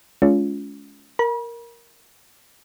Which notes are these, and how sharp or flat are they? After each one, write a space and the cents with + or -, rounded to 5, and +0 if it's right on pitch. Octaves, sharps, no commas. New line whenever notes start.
G#3 +30 C#4 +30 F4 +0
A#4 +0 B5 -45